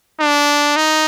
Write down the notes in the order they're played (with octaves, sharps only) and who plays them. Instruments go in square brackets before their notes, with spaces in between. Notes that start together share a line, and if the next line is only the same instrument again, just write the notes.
[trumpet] D4
D#4